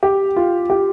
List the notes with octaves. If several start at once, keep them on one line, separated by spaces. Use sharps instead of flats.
G4
F4
G4